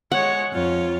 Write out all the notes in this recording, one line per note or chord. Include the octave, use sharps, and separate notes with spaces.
G#3 C#5 F#5
F2 F4 C#5